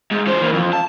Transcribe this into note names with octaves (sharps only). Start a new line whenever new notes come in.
G#2
E3 C5
E3 A#3
F2
A5